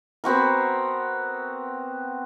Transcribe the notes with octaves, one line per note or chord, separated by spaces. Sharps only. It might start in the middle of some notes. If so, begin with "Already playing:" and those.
B3 C4 F#4 A#4